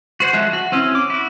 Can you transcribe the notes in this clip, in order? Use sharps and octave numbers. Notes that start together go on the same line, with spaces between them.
F#4 C5 C#5 F#5
F3 G#3 F4 E5 F#6
F#4
C4 C#4 E4
D6
E4 F#4